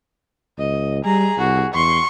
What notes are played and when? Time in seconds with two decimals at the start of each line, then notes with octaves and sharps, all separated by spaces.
0.58 C#2 D#5
1.05 G3 G#4 A#5
1.38 C2 F#4
1.74 E2 C6 C#6